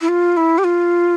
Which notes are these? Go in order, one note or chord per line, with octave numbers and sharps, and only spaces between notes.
E4
F4
E4
G4
F4